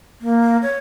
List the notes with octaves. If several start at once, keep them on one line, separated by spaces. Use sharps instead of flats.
A#3
C#5